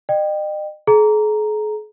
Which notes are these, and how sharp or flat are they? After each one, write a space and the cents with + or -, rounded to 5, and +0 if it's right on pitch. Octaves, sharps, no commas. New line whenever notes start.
D#5 -40 G5 +0
G#4 +45 A#5 +0